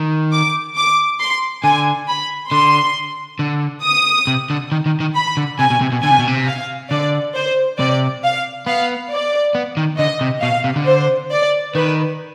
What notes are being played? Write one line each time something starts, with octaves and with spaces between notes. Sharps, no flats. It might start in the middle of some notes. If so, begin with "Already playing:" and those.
Already playing: D#3
D6
D6
C6
D3 G#5
B5
D3 C6
D3
D#6
C3
D3
D#3
D#3
D#3
B5
D3
C3 G#5
B2
C3
B2
D3 G#5
C3
B2
C3
F5
D3 D5
C5
C3 D5
F5
B3 F5
D5
B3
D#3
D3 D#5
C3
B2 F5
C3
D3
C5
D5
D#3 B4